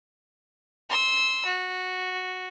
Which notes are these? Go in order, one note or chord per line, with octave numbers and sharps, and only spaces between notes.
C6 E6
F#4